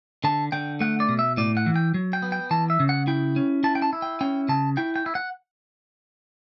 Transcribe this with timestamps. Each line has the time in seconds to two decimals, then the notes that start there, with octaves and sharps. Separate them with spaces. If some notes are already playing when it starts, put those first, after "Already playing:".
0.24 D3 A5
0.52 D3 G5
0.80 A3 F#5
1.00 D5
1.09 B2
1.19 E5
1.37 A2 D5
1.57 F#5
1.66 E3
1.76 G5
1.94 F#3
2.13 G5
2.22 B3
2.32 G5
2.51 E3 A5
2.70 E5
2.80 C#3
2.89 F#5
3.07 E4 G5
3.36 C#4
3.63 E4 A5
3.75 G5
3.82 A5
3.93 E4
4.02 G5
4.21 C#4 G5
4.49 C#3 A5
4.77 E4 G5
4.96 G5
5.06 E4
5.15 F#5